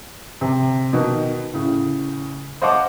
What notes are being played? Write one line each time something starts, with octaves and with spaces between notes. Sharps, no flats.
C3
B2 D#3
A2 C#3
C5 D#5 F5 F#5 A5 D6